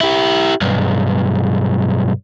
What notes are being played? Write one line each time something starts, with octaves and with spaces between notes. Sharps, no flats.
E4 G4
B1 G2